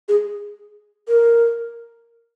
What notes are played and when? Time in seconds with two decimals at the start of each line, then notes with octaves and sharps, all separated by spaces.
0.09 G#4
1.08 A#4